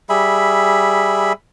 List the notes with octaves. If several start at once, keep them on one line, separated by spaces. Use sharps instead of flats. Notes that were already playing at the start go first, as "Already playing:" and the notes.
G3 G#4 E5 B5